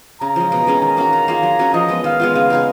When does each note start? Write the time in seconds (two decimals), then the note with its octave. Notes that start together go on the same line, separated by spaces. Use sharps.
0.21 C#3 A#5
0.36 F3 G#3
0.52 B2
0.67 G#3 C#4 G#4
0.81 D#3 A#5
0.97 A#3 C#4 F#4
1.13 D#3
1.28 A#3 F4 G#4
1.43 F#3
1.59 C#4 F#4 C#5
1.74 F3 D#5
1.89 G#3 B3
2.04 D#3 F5
2.20 G#3 B3 F4
2.35 C#3 F5
2.50 G#3 D#4 G#4